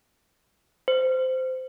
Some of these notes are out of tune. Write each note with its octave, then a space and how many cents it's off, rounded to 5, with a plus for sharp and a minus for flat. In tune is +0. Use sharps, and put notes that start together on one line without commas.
C5 -15